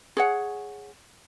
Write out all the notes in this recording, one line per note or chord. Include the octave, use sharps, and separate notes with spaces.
G#4 C#5 F#5